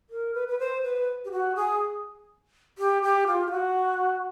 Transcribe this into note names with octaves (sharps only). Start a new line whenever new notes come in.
A#4
B4
B4
C5
B4
G4
F#4
G#4
G4
G4
F4
G4
F#4